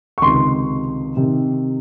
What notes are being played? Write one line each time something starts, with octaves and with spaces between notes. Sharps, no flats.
C#6
C#2 C3 D#3 C6
C3 D#3